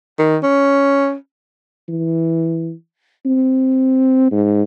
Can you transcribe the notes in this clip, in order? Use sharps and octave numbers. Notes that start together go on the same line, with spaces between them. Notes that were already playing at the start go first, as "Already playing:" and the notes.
D#3
C#4
E3
C4
G#2